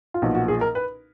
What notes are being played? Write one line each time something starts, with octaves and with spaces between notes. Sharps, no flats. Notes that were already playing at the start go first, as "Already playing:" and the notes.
F4
B1 A#2 F3 B3 F#4
F#4
G#4
A#4
B4